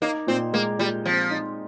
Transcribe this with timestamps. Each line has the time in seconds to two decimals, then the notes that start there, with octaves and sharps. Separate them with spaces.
0.02 A#3 D#4
0.27 A#2 C4
0.53 G#3 A#3
0.79 A#2 G3
1.05 F3 C4
1.31 D#4